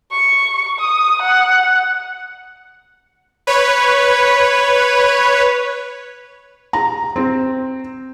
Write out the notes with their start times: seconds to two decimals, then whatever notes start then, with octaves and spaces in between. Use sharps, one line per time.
0.12 C#6
0.79 D#6
1.22 F#5
3.47 B4 C#5
6.73 A#5
7.16 C4